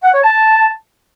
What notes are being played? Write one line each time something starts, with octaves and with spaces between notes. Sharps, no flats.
F#5
C#5
A5